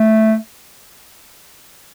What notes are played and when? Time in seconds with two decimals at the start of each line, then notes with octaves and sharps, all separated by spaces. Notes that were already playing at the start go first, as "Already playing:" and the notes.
Already playing: A3